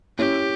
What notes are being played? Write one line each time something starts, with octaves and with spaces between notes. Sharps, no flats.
C#4 E4 G4